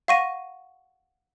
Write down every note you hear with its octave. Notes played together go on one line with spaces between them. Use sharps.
F5 F#5 C#6 A#6 D#7